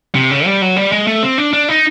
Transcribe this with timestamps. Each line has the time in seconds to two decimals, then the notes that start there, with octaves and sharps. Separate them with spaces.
0.15 C3
0.31 C#3
0.46 G3
0.62 F#3
0.76 G3
0.92 G#3
1.07 A3
1.23 C4
1.38 D4
1.53 D4
1.69 D#4